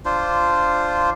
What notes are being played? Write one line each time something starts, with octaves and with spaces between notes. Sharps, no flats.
D4 F4 C5